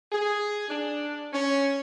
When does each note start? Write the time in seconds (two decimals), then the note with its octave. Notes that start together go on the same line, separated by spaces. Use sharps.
0.11 G#4
0.68 D4
1.32 C#4